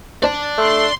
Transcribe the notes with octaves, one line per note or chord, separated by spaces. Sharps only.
D4 C5 D5 A5
A3 C6